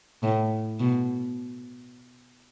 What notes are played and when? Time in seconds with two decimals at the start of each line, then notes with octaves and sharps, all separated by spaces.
0.23 A2
0.79 B2